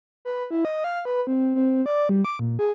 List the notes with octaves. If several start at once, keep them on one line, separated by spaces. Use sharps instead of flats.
B4
E4
D#5
F5
B4
C4
C4
D5
G3
D6
A#2
G#4